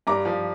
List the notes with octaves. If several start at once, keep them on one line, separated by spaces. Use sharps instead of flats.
G2 A#5 D6
F3